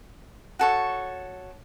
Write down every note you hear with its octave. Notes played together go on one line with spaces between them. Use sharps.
F#4 A4 C#5